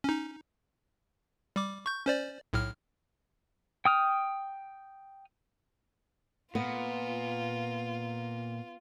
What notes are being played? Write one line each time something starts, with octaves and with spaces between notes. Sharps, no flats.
C#4 D#4
G3 D6
C#6 G6
C#4 C5 D5
B1 A2 F6
G5 D#6 F6
A#2 B3 F4